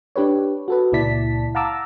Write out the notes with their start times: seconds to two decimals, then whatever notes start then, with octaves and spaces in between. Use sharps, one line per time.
0.16 D4 G4 B4 C#5
0.68 F#4 A4 B4
0.92 C#2 A#2 E4 D5 A5 B6
1.55 F5 F#5 A5 A#5 D6 E6